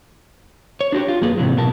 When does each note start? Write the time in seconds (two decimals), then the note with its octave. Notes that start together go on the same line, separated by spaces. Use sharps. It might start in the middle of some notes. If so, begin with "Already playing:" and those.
0.81 C#5
0.92 D4 F#4 G4
1.08 F4
1.22 F#2 A#3 G#4 B4
1.38 G#2 C3 E3 F#3
1.57 B2 A#4 A5